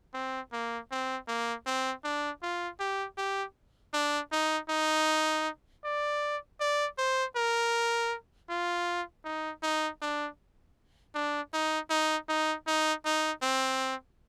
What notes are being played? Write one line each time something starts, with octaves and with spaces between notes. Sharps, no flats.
C4
A#3
C4
A#3
C4
D4
F4
G4
G4
D4
D#4
D#4
D5
D5
C5
A#4
F4
D#4
D#4
D4
D4
D#4
D#4
D#4
D#4
D#4
C4